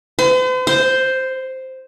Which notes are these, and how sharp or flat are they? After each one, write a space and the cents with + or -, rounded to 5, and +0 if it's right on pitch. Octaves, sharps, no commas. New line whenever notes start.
C5 -45
C5 +0